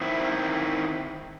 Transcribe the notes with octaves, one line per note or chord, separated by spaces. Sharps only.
D#3 C4 E4